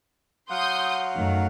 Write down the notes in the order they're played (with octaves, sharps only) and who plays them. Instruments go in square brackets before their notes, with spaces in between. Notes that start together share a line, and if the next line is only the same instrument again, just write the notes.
[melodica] F#3 F5 F#5 [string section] C6 D#6 G6
[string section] F#2 D#3 A3